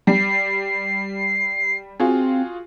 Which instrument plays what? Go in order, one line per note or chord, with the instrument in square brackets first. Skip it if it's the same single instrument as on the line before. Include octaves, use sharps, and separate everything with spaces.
[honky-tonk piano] G3 [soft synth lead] C7
[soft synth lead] C4 [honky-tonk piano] F4 F#4 G#4